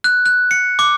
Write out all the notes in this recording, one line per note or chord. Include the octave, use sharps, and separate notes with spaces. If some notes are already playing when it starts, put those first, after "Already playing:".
F#6
F#6
C#7
D6